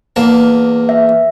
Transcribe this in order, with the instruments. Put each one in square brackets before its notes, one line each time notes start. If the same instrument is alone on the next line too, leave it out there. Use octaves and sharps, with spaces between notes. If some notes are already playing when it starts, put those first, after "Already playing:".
[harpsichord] E2 A#3 A5
[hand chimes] E5